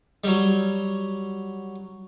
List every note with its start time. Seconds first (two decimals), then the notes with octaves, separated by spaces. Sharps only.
0.24 F#3 G3